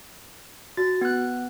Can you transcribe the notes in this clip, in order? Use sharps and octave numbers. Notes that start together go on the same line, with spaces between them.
F#4 A6
B3 F#6